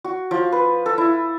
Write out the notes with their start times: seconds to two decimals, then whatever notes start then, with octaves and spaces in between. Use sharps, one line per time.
0.04 F#4
0.31 F3
0.52 B4
0.86 A4
0.98 E4